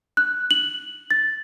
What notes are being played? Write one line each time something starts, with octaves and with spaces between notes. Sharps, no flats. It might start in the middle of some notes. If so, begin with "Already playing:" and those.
F#6
F#7
A6